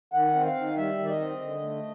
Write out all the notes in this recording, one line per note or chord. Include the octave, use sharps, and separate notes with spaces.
D#3 F#5
C4
F5
D#3
G3 E5
D#3
D5
D#5
C4
D3
A3